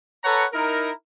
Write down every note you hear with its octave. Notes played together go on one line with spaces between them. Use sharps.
A4 B4 C#5 F#5 A#5
D#4 E4 A#4